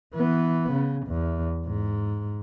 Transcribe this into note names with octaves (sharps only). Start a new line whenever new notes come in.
E3 B3
C#3
E2
G#2